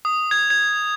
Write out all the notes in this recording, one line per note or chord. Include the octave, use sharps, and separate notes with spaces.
D#6
G#6
G#6